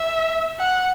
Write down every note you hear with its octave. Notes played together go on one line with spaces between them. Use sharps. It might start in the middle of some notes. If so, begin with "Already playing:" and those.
Already playing: E5
F#5